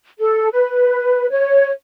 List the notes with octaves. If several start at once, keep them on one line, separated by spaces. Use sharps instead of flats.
A4
B4
C#5